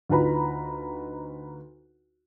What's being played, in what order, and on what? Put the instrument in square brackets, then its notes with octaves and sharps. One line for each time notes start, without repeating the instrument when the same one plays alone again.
[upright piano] D2 D#4 F4 B4 A#5 B5